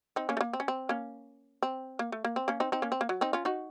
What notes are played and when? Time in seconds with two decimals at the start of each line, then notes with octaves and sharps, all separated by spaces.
0.16 C4 D#4
0.29 A#3 C#4
0.37 A3
0.41 A#3
0.53 C4
0.60 C#4
0.68 C4
0.89 A#3 C#4
1.63 C4
1.99 A#3
2.12 A3
2.24 A#3
2.36 C4
2.48 A#3 C#4
2.60 C4 D#4
2.72 C4 D#4
2.82 A#3 C#4
2.92 C4
3.01 A#3
3.09 F#3
3.21 C4 D#4
3.33 C#4 F4
3.45 D#4 F#4